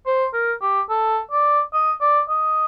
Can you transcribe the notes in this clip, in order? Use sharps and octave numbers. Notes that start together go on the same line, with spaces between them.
C5
A#4
G4
A4
D5
D#5
D5
D#5